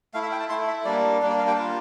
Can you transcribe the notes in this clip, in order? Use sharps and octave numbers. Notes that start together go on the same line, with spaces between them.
A3 E4 F5
E5
G5
A5
A3 E4 C6
E5
G3 A#3 D4 D5
G3 A#3 D4
D5
F5
G5
A#3 F4 A5